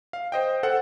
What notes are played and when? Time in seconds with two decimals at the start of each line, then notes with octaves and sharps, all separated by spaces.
0.13 F5
0.32 C5 D#5 G5
0.63 A4 C5 F#5